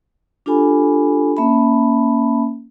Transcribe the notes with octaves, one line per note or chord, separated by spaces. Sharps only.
D4 F4 G4 A4 G#5 B5
A#3 C#4 E5 A5 B5